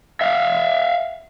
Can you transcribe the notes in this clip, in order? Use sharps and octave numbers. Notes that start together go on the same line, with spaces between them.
E5 F5